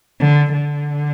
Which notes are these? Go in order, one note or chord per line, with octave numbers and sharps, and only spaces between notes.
D3
D3